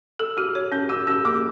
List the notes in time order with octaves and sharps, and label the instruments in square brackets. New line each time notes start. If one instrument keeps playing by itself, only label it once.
[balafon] A4 [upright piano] E6
[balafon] F#4 [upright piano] F6
[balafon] C#5
[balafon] C#4 [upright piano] G6
[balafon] F#4 [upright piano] E6
[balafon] C#4 [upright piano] E6
[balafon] A#3 [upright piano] D6